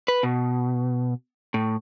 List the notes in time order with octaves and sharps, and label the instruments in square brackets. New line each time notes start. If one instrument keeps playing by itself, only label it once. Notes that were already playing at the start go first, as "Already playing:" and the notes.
[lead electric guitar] B4
B2
A2